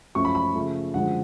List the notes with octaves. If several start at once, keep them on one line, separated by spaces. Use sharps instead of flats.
F#2 F3 A3 C#4 C#6
B5
B5
C#3 F3 A3
F#2 D3 F3 G#3 F#5